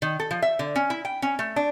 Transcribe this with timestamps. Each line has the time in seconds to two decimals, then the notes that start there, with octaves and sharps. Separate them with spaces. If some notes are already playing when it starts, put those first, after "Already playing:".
0.02 D#3
0.20 A4
0.31 F3
0.42 E5
0.59 D3
0.76 C#4
0.90 E4
1.05 G5
1.22 C#4
1.39 A3
1.56 D4